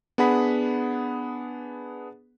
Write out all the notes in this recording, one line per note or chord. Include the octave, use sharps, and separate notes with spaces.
B3 D4 G#4 F#5 B5 B6